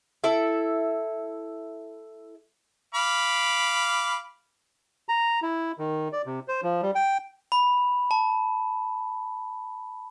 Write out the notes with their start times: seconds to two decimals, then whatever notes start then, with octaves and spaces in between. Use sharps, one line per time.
0.24 E4 A4 E5
2.94 F5 B5 D6
5.09 A#5
5.42 E4
5.79 D#3
6.13 D5
6.26 C3
6.48 C5
6.63 F3
6.82 G3
6.95 G5
7.52 B5
8.11 A5